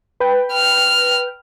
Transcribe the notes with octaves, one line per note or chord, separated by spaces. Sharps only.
B4 G5
F6